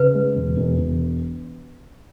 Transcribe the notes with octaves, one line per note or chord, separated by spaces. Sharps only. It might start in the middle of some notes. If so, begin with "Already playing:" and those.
Already playing: C#3 B4
G#3
E1
E1
E1